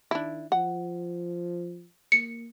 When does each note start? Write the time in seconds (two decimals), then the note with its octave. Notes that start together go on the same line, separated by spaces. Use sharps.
0.11 D#3 D4 E4
0.52 F3 F#5
2.12 A#3 C#7